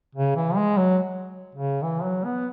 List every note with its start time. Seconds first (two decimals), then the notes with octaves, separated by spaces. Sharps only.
0.15 C#3
0.36 E3
0.56 G#3
0.77 F#3
1.55 C#3
1.83 E3
2.04 F#3
2.24 B3